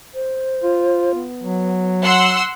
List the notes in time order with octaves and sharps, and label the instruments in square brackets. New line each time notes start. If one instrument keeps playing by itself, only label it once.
[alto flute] C5
[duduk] F4
[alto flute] B3
[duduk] F#3
[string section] F#5 C6 E6